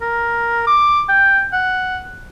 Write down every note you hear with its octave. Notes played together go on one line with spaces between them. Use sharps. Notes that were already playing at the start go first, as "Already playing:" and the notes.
A#4
D6
G5
F#5